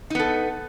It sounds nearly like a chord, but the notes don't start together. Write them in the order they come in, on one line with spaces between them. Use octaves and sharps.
D#4 B3 A4